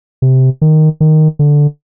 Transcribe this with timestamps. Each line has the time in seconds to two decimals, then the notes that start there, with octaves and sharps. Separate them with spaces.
0.22 C3
0.62 D#3
1.00 D#3
1.39 D3